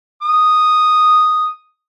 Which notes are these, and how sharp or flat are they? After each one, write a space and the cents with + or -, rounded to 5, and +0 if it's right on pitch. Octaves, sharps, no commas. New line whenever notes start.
D#6 -5